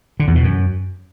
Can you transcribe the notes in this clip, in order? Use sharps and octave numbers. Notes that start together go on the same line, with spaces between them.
D3
E2
B2
F#2